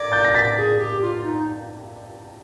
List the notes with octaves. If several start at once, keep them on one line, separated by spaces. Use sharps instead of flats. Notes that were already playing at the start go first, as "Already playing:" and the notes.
Already playing: D5 G#6 A#6
G6 A6
A#6
A6 B6
G#4
G4
F4
D#4